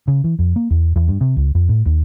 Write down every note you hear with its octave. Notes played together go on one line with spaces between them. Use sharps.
C#3
E3
F2
A#3
E2
E2
G2
C3
C#2
F2
A2
D#2